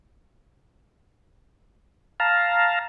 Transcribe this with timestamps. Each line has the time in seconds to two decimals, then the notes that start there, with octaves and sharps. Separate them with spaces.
2.20 F5 A5 A#5